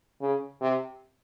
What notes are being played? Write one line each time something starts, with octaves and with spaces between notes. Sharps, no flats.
C#3
C3